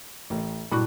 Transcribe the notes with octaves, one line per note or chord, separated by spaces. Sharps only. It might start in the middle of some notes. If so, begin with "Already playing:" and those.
A1
G2 A#2 F#3 E4 C#6 F#6